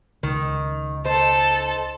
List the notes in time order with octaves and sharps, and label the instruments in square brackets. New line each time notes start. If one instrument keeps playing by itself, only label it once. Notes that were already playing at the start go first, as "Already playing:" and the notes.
[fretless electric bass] C#2 [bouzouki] D#3
[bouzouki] D#4 C5 [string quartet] A4 A5